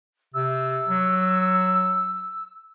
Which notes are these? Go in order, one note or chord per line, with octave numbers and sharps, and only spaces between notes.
C3 E6
F#3